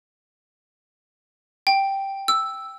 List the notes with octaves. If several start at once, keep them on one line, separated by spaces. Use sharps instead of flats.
G5
E6